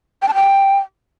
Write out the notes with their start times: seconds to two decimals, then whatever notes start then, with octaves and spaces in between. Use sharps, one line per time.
0.22 G5
0.28 A5
0.35 G5